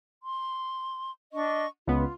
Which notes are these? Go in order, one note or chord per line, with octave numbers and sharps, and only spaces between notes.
C6
D4 D#5 C#6
C#2 B3 F4